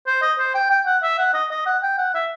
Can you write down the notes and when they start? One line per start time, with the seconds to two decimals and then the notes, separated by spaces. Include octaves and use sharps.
0.07 C5
0.22 D#5
0.38 C5
0.54 G5
0.70 G5
0.86 F#5
1.03 E5
1.18 F#5
1.34 D#5
1.50 D#5
1.66 F#5
1.82 G5
1.98 F#5
2.14 E5